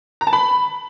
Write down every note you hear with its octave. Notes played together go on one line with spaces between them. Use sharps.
A#5
A5
B5